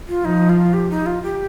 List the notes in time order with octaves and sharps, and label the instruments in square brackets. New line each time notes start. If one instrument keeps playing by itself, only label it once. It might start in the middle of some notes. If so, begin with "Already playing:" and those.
[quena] F4
[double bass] F3 [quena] D#4
[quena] F4
G4
D#4
F4
G4